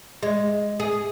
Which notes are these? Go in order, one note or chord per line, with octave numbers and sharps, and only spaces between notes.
G#3
G#4